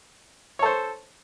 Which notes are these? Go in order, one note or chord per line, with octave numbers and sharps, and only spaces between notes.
A4 C5 C#5